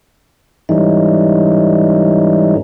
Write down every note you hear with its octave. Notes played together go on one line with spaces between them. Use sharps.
G#2 E3 G3 A3 C#4 D#4